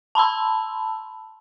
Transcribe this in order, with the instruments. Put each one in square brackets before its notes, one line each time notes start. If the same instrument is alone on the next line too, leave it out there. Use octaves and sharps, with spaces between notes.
[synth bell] A5 B5 C6 E6